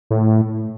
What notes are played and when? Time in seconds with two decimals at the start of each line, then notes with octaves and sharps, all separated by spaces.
0.11 A2